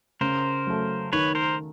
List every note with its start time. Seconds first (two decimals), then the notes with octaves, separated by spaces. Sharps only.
0.21 C#3 A#4 C5
0.67 F#3 A3
1.13 D#3 B4 C#5
1.35 A#4 C5